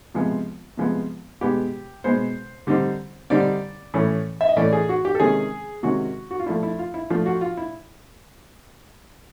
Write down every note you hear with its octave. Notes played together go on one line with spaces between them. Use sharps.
C3 F3 G#3 B3
C3 F3 G#3 B3
B2 G#3 B3 G4
B2 G#3 B3 C5
D3 G3 C4 D#4
D3 G3 C4 D#4 D5
A2 E3 A3 C#4
E5
D#5
A2 E3 A3 C#4 D5
G#4
F#4
G4
A4
C3 D#3 G#3 C#4 G#4
C3 D#3 G#3 C#4 F#4
F#4
F4
F3 A3 D4 E4
E4
F4
E4
F3 A3 D4 F4
F#4
F4
E4